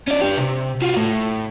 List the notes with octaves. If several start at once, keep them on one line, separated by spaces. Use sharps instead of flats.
C#4 D5
D4 G4
C3
F4 F#4
A2